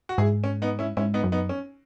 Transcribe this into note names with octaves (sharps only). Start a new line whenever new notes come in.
F#4
G#2 E4 G#4
C#4
B3 D#4
C#4 E4
G#2 C#4 E4
B3 D#4
F#2
B3 D#4
C#4